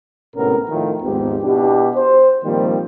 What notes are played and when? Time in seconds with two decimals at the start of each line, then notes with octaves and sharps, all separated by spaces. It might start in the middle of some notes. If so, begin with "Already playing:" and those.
0.35 G#1 A2 C3 B3 C#4 A#4
0.70 A2 D#3 F3 F4
1.02 G#1 D#2 G#2 F3 B3 G4
1.43 B2 D4 E4 G4
1.95 C5
2.44 A#2 D#3 F3 G3 A#3 C4